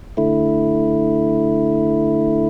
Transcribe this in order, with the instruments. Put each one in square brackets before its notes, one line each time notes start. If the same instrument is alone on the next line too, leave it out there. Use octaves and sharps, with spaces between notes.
[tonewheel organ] D3 A3 E4